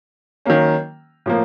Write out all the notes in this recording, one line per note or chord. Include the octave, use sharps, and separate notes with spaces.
D#3 F#3 A#3 C#4
A2 F3 A#3